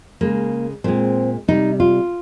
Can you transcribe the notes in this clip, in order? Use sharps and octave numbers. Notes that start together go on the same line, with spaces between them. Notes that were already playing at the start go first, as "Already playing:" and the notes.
C#3 G#3 A#3
A#2 G#3 C4
C3 G3 D#4
F4